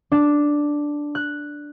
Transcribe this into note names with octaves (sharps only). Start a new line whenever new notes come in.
D4
F#6